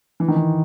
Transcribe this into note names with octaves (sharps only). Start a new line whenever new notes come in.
E3
D#3
E3